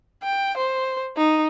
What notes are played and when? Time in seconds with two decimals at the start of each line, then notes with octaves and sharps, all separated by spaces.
0.23 G5
0.57 C5
1.17 D#4